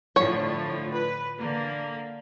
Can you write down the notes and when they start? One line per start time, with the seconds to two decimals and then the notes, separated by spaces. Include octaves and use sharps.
0.16 A2 D3 F3 C#5
0.92 B4
1.39 D3 A#3